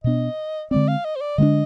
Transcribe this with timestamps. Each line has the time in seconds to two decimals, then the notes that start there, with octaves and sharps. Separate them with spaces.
0.04 B2 B3 D4 D#5
0.71 D3 G#3 C4 D5
0.88 F5
1.05 D#5
1.16 C5
1.21 D5
1.38 D3 G#3 B3 D4 D#5